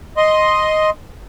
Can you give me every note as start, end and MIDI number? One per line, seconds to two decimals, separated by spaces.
0.17 0.90 75
0.17 0.90 84